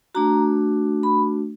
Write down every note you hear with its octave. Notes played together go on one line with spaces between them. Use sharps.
A3 D4 F#4 A#5
B5